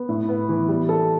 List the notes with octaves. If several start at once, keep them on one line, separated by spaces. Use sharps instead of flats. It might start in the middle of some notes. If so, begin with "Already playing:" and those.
Already playing: B3
A2
B3
E3
G3
A4